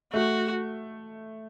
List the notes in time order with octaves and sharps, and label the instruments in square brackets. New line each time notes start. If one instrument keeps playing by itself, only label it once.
[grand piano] A3 [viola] F#4